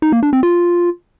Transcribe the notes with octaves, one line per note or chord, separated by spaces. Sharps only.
D#4
A#3
D4
C4
F4